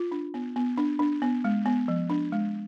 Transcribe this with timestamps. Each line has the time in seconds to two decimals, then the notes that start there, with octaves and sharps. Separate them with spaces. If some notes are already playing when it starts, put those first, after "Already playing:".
Already playing: F4
0.12 D4
0.34 B3
0.56 B3
0.78 D4
0.99 D4
1.22 B3
1.44 G#3
1.66 B3
1.88 F3
2.10 D4
2.32 G#3